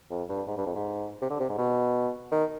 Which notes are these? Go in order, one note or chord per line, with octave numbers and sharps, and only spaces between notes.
F2
G2
G#2
G2
F2
G#2
C3
D3
C3
G#2
B2
D#3